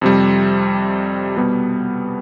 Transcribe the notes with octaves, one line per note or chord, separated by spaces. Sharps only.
F2 C3 G3
B2 G3 B3